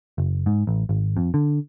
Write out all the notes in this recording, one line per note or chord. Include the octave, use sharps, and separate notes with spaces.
F#1
G#2
A1
G#1
F2
D3